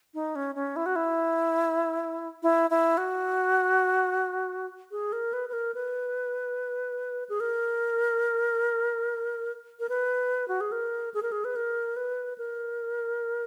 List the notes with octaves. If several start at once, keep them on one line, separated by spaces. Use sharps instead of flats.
D#4
C#4
C#4
E4
F#4
E4
E4
E4
F#4
G#4
A#4
B4
B4
A#4
B4
G#4
A#4
A#4
B4
F#4
G#4
A#4
G#4
A#4
G#4
B4
A#4
B4
A#4